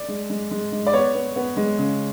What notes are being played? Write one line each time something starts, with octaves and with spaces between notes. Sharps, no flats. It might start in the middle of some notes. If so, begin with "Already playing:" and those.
Already playing: D5
G#3
G#3
G#3
G#3
D5
B3 C#5
B3
B3
G#3
C#3